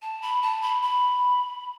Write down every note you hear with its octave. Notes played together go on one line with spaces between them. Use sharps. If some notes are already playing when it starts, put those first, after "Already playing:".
A5
B5
A5
B5
B5